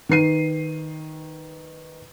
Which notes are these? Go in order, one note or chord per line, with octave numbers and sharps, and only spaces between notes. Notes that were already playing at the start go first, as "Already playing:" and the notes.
D#3 B4 C7 D#7